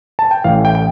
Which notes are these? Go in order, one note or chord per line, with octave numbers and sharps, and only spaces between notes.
A5
G5
A1 A2 E3 F5
G5
G5